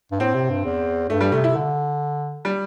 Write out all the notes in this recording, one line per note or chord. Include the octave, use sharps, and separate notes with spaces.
G2
A2 C4
C3
G2
E2
G2 A3
G3
C3 A3
C3 E4
D3
G3